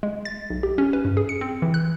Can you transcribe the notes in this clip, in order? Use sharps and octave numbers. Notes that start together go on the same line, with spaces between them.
G#3
A6
B1
G4
C#4
B4
G2
G#4
C#7
C4
E3
F#6